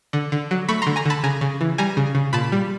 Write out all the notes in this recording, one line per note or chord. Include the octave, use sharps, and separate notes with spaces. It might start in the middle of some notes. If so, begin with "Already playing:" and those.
D3
D3
F#3
A3 B5 C#6
A#5 C6
D3
G#5 A#5
D3 A5 B5
C#3 G#5 A#5
C#3
E3
G3 G#5 A#5
C#3
C#3
A#2 A5 B5
G3